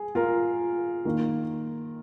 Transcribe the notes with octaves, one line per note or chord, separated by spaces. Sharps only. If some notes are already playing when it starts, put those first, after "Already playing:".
Already playing: G#4
F4 A#4
D#3 A#3 D#4